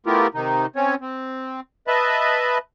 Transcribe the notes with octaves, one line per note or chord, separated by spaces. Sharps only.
A3 B3 E4 F4 G4 A#4
C3 D#3 D#4
C4 C#4 C#5
C4
B4 D#5 E5 A5 B5